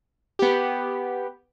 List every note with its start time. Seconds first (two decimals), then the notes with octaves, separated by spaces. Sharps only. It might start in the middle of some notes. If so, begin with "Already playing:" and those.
0.39 B3 G4